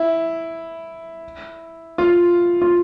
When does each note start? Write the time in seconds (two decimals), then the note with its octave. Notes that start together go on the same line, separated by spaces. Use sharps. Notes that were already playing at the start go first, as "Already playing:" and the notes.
Already playing: E4
1.98 F4
2.62 F4